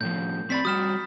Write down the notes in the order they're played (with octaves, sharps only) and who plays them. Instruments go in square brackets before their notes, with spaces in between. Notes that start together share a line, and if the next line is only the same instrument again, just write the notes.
[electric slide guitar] A2 E3 F3 [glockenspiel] G6
[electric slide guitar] C4 D5 [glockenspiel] B5 A6 B6
[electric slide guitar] G3 F#4 [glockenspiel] D#6 F6 E7